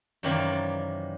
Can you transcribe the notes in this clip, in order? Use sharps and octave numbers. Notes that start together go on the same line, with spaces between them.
F#2 C3 D#3 E3 A#3 D5